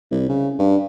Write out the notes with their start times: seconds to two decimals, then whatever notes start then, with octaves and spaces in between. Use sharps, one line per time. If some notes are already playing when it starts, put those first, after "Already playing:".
0.12 C2
0.29 C#3
0.59 G2